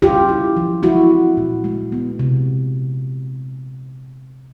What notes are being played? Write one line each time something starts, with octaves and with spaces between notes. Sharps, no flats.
C#4 F4 G4
E4
F3
G#3 E4 F#4
C4
A#2
G#3
B3
C3